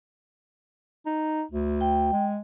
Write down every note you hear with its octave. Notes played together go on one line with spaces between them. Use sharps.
D#4
D2
G5
G#3